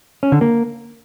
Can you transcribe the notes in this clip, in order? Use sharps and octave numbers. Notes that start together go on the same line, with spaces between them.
C#4
D3
A#3